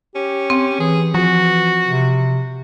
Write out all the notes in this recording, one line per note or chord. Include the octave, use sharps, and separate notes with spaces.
C#4 G4
C4
E3 G#4
E3 F3 F#4
C3